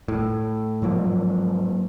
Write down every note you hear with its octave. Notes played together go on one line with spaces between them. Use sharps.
A2
G#2 F3 F#3 A#3